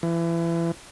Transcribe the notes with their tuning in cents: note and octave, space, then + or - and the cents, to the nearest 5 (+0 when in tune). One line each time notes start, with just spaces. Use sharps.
E3 +30